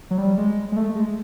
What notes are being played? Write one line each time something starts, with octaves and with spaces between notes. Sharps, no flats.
F#3
G3
G#3
G#3
A3
G#3